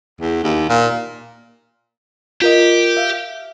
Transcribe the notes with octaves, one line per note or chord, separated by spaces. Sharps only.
E2
D#2
A#2
F4 G4 A#4 D#5
E5 F5